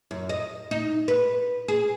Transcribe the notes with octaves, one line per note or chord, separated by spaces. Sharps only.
F#2
D#5
D#4
B4
G#4